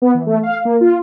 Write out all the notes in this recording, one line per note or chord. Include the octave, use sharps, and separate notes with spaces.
B3
E3
A3
F5
A#3
F4